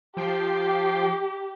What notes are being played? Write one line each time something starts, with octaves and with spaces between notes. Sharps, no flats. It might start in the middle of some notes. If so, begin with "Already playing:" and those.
F3 G4 G5 C7